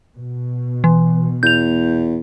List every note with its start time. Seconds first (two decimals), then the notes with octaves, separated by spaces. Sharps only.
0.14 B2
0.84 E3
1.43 E2 G6 F7